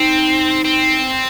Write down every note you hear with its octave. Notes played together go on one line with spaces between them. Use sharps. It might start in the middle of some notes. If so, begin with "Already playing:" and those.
Already playing: C4 D#4
C4